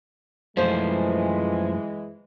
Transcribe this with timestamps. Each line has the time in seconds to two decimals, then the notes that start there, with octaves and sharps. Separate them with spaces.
0.57 F#2 E3 F3 G#3 A3 C5